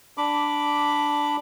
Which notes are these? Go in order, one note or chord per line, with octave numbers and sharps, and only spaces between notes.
D4 B5 D6